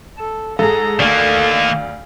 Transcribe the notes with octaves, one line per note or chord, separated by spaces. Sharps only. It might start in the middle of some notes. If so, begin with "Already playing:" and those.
A4
G#2 G#4 A4 A#5
D2 D#3 A#3 D5 F5